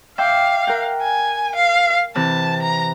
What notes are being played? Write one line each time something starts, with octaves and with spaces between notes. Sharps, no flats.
E5 F5 G5 D6
A#4 F#5 G5
G#5
F5
C3 E3 A5
A#5